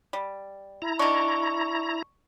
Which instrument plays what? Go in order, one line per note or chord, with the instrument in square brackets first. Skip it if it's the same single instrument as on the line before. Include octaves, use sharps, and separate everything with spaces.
[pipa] G3
[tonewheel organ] E4 A#5
[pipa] D#3 D4 [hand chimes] C#6